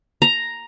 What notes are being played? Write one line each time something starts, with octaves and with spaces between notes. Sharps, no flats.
A#5